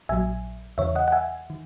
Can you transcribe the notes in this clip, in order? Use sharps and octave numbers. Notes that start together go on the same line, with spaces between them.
A#1 A#2 F#3 E5 G#5
E2 C#3 E3 C#5 E5
D#5 F#5
F#5
E5 G#5
D#3